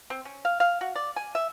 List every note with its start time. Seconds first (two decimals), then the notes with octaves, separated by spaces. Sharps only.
0.10 C4
0.25 C#4
0.45 F5
0.60 F5
0.81 F#4
0.96 D5
1.16 G#5
1.35 E5